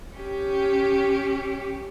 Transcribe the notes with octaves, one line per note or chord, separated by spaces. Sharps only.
C#4 G4